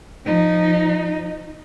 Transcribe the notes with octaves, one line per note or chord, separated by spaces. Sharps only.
F3 D#4